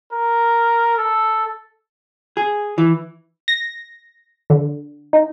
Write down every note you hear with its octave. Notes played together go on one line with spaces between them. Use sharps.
A#4
A4
G#4
E3
A#6
D3
D#4